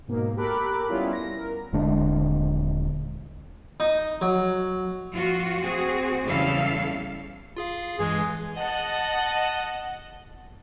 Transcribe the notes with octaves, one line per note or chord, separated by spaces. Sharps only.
G#2 B2 A#3
G4 A4 A#4 B5 D6 F#6
G3 B3 C#4 E4 F4
A#6
A#4
D#1 D3 G#3 D4
D#4
F#3
F2 F4 F#4
C4 F#4 G#4
E2 C#3 G3 E4 A4 F5
F4 G#4 F5
G2 E3 G#3 G#4
D#5 F#5 A5